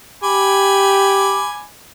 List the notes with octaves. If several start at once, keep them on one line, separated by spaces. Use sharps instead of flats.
G4 G#5 B5 D6